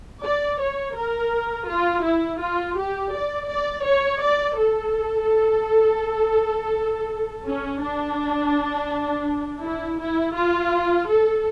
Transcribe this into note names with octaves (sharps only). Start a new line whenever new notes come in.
D5
C#5
A#4
F4
E4
F4
G4
D5
D5
C#5
D5
A4
C#4
D4
E4
E4
F4
A4